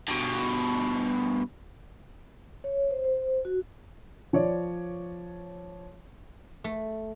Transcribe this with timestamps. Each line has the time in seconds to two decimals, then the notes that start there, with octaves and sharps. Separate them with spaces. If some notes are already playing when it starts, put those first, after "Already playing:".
0.08 G2 B2
2.64 C#5
2.91 C5
3.04 C5
3.45 F#4
4.33 F3 C#5 D5
6.64 A3